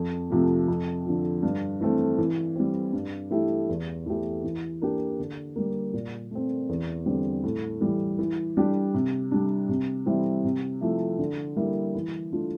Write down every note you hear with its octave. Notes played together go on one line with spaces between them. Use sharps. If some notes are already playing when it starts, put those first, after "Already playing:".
Already playing: F2
C3 F3 A3
F2
D3 F3
G2
E3 A3 C4
E3
G3 C4
G2
E3 A3 E4 G4
E2
E3 A3 E4 G4
E3
A#3 D4 G4
D3
G3 A#3
A#2
A3 C4
E2
D3 G3 C4
A2
E3 G3
E3
G3 D4 G4
C3
G3 D4
C3
E3 G3 C4 E4
C3
F3 A3 E4
D3
G3 A#3 E4
E3
A3 D4 F4